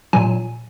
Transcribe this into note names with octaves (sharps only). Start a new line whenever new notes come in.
A#2 F#3 G#5